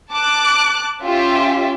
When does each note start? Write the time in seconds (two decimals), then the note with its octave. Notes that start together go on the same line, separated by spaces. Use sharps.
0.11 A5 D6 F#6
1.04 C#4 F4 G4 E5